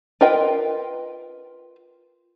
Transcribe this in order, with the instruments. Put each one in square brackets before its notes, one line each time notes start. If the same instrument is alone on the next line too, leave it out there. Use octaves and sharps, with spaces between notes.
[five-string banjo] F4 A#4 B4 D#5 G5